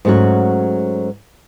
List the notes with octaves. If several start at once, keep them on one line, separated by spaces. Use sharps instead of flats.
G#2 F#3 A3 C#4 F#4